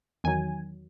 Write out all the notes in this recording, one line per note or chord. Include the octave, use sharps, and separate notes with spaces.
E2 D#3 F#3 G#5